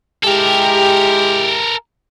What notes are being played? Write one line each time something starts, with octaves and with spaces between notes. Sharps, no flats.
G#3 E4 G4 A4 A#4